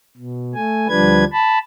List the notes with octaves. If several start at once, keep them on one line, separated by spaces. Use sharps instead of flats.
B2
A3 G#5
D2 F3 G3 D4 B4 G#6
A5 B5